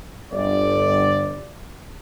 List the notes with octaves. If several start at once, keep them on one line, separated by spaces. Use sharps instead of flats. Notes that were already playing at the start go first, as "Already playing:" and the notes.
G1 D5